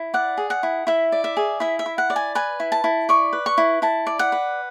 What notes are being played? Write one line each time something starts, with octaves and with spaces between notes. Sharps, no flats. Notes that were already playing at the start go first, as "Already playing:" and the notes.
Already playing: E4
D5 F#5
G#4
F#5
E4
E4 E5
D5
E5
G#4
E4 E5
E5
E4
F#5
D5
G#5
B4 G#5
E4
A5
E4
D5 C#6
B4
C#6
E4
E4 A5
D5
F#5
B4